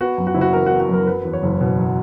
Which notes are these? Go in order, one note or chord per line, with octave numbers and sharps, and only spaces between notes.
B3 F#4
F#2
F#4
F#1 E4
F#4
E3 A#4
F#4
B3
F#4
F#2 A#4
F#3 B4
E2
C#5
F#1
B2
F#3